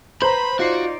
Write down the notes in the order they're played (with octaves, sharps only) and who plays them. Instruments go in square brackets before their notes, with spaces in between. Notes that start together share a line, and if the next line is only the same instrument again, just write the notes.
[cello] B4 [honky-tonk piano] C5 [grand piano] A#5 F#7 [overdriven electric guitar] B5
[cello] D#4 D5 [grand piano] F4 C7 [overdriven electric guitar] F#4